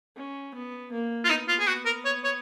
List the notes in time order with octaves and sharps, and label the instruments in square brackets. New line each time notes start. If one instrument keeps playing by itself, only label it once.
[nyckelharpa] C#4
B3
A#3
[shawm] F4
[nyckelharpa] B3 [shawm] D#4
[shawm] F4
G#4
F#4
A#4
C#5
C#5